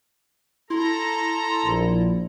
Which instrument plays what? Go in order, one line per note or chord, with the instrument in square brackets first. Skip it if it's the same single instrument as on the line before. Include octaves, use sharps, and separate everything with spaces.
[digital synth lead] E4 [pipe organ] A4 A#5 [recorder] C6
[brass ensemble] A#1